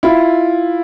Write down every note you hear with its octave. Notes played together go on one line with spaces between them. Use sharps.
E4 F4